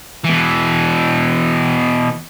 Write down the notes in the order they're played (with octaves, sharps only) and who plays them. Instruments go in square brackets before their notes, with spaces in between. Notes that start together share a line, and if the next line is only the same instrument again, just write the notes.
[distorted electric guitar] B2 E3